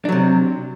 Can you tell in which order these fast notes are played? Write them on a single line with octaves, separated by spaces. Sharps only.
D4 F#3 C3